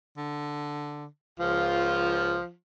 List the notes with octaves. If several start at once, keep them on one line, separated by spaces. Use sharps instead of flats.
D3
C#2 F3 F4